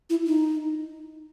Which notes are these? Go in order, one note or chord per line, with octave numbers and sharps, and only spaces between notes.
E4
D#4